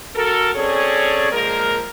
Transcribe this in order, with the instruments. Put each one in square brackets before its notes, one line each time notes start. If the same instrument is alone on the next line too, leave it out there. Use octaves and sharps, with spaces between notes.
[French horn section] F#4 A4 A#4
C4 C#4 G#4 A4 C#5 D5
F3 G#3 A#3 G#4 A#4